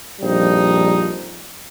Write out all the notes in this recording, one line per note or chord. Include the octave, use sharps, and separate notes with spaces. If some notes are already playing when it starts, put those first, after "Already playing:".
A#1 F2 F3 G3 D#4